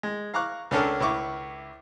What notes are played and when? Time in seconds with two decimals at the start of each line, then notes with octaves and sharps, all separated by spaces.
0.03 G#3
0.34 F5 A#5 C#6 D6 F#6
0.71 C#2 C#4 D4 A4 A#4
1.00 C#2 E4 C#6 D6